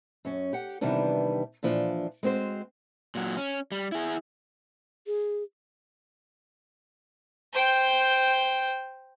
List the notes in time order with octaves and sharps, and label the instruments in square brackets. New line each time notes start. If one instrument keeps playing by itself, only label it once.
[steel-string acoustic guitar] F#2 C#4
G4 F#5
C3 D#3 E3 G3 B3 D4
A#2 E3 F3 D4
G#3 C4 F#4 C5
[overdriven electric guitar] A#2 F#3
C#4
G3
E4 G#4
[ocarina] G#4
[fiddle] C5 G5